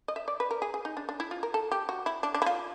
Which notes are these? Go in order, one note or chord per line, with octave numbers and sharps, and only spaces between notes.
D#5
E5
D5
B4
A#4
G#4
G#4
D#4
D4
D4
E4
F4
A#4
A4
G4
F#4
E4
D4
D4
E4
F4